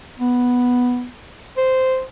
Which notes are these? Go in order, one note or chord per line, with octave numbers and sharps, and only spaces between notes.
B3
C5